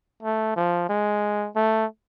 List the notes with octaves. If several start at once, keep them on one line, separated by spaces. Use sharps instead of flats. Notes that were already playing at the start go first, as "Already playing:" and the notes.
A3
F3
G#3
A3